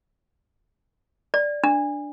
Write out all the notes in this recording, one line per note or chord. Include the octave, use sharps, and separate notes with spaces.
D5
D4